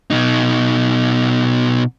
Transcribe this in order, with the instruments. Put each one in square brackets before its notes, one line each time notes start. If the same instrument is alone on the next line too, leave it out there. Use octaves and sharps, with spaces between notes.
[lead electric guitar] B2 D#4